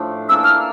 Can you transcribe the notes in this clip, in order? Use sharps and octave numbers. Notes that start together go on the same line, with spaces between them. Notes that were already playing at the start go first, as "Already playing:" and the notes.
Already playing: A2 F3 A3 D4
E3 A#3 D4 A4 E6
F6